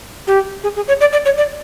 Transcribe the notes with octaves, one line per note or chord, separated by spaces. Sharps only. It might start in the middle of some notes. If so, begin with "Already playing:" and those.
G4
G#4
G#4
C#5
D5
D5
C#5
D5